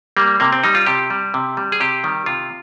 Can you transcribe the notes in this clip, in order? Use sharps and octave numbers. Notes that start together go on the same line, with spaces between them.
G3 A#3
C3 A#3
C4
G3 D#4
F4
C3 G4
G3
C3
G3
G#4
C3 G4
D#3 G3
C3 F4